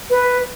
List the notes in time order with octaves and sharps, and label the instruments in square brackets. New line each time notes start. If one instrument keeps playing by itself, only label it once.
[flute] B4